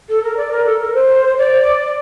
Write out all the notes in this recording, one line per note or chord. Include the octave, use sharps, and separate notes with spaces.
A4
A#4
D5
A#4
A4
A#4
C5
D5